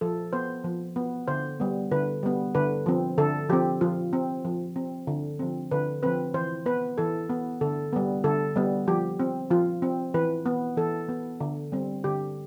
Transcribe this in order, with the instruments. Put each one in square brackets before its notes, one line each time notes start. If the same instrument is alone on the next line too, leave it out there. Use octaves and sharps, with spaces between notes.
[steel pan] F3 A4
B3 C5
F3
B3
D3 C5
G3 B3
D3 B4
G3 B3
D3 B4
F3 C4
D3 A4
F3 C4 G4
F3 F4
C4
F3
C4
D3
F3 C4
D3 B4
F3 C4 B4
E3 C5
B3 B4
E3 A4
B3
D3 A4
G3 B3
D3 A4
G3 B3
F3 G4
C4
F3 F4
C4
E3 B4
B3
E3 A4
B3
D3
G3 C4
D3 G4